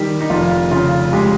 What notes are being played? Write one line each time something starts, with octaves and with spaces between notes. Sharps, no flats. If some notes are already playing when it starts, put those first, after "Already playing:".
Already playing: D#3 G3 G4
D#4
F1 F4
C#3 F4
G#3 G4